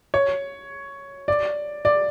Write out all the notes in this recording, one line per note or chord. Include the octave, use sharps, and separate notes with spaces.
C#5
D5
D5